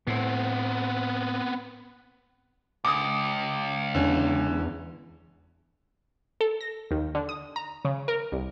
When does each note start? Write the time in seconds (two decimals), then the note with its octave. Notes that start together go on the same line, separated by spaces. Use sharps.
0.07 A2 B3 C4
2.85 C#2 D6 D#6
3.95 E2 D3 C#4
6.41 A4
6.61 A#6
6.91 D#2
7.15 D3
7.29 D#6
7.56 A#5
7.85 C#3
8.08 A#4
8.32 C2